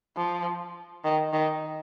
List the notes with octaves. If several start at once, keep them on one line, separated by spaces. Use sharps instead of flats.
F3
D#3
D#3